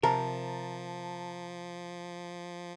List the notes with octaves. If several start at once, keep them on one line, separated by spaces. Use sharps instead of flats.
C3 F3 A#4 A5 A#5